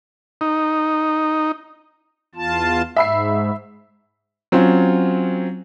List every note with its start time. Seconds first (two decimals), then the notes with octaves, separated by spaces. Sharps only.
0.41 D#4
2.35 E2 F4 A5
2.96 G#2 E5 B5 C7
4.52 F#3 C4 C#4 F4